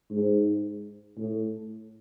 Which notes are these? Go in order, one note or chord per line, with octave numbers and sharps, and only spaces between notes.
G#2
A2